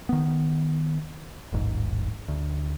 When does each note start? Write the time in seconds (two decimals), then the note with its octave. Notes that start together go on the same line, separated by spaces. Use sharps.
0.09 D#3 B3
1.52 D#1 A1 G#2
2.28 D2